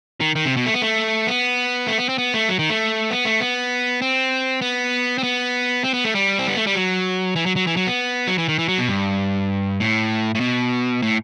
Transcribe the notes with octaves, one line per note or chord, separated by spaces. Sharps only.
D#3
D#3
C3
B2
A3
B3
A3
B3
A3
B3
C4
B3
A3
F#3
D#3
A3
B3
A3
B3
C4
B3
C4
B3
C4
B3
A3
G3
C4
B3
A3
G3
F#3
E3
F#3
F#3
E3
F#3
B3
F#3
E3
D#3
E3
F#3
B2
G2
A2
A2
B2
A2